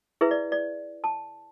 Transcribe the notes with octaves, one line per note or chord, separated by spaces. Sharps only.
E4 G#4 B4 E5
D5
D5
A5